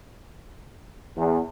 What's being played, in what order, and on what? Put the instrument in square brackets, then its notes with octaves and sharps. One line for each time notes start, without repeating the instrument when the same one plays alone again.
[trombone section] E2